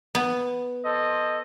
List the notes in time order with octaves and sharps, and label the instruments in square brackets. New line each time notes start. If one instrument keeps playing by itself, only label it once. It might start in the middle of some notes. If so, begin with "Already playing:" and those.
[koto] B3
[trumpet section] A4 C5 D#5